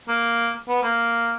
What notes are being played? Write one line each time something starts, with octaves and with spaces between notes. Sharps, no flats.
A#3
B3
A#3